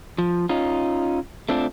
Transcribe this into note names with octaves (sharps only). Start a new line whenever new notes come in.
F3
C#4 D#4 F4
A3 C4 D4 F4